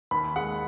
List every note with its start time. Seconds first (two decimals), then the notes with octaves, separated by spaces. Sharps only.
0.11 D#2 B5
0.36 G#3 F#5